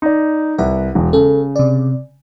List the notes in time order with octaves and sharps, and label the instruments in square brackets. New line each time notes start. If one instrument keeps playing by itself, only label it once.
[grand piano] D#4 D5
[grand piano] C2 [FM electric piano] B4 F#5
[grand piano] E1
[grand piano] C#3 [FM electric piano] A4
[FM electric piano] C3 D5